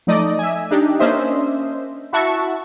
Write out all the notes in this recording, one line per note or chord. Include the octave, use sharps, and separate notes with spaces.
F3 A3 D#4 D5 D#5
E5 G#5
D4 D#4 G4
A#3 C#4 D4 C5 D#5 E5
E4 F#4 E5 A5 C#6